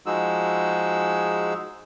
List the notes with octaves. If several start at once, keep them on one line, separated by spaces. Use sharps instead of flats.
F3 G#3 D#4 F#4 G#4 E6